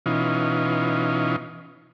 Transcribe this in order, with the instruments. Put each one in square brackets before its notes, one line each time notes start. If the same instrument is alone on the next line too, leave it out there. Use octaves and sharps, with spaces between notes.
[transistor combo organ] B2 E3 C#4 D#4 F4